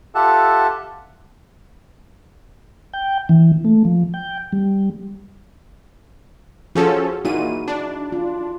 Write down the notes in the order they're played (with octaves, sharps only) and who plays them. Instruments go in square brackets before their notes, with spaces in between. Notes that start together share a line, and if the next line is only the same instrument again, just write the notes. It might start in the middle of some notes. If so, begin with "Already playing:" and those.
[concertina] F4 G4 A4 E5 F#5 A5
[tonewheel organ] G5
E3
A3
F3
G5
G3
[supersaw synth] F3 C#4 A4 [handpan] F#4 G#4
[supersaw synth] A#2 D#7 [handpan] D#4 E4 F#4
[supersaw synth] D4
[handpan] F4